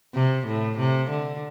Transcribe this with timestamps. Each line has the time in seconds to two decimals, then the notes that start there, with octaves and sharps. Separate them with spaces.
0.15 C3
0.47 A2
0.79 C3
1.10 D3